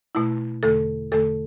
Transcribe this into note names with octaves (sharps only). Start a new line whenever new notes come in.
B2 A3 E4
E2 D3 A3 A4
E2 D3 A3 A4